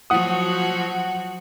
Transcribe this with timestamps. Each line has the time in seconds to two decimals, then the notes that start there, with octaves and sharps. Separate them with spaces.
0.10 F3 F#3 F#4 F#5 D#6